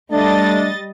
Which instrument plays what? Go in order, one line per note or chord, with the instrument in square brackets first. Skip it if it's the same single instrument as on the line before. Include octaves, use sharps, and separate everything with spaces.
[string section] G3 D#5 A6 [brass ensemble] A3 D4